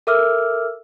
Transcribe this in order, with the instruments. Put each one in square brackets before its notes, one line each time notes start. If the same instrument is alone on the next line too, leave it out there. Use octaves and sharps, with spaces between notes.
[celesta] A4 A#4 E5 D6 E6 F6